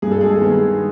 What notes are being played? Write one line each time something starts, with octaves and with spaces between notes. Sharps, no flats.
G2 G#4
A4
G#3 G#4
D#3 G#3 B3